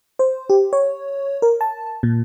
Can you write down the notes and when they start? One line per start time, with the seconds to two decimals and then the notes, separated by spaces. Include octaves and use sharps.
0.19 C5
0.50 G4
0.73 C#5
1.42 A#4
1.61 A5
2.03 A#2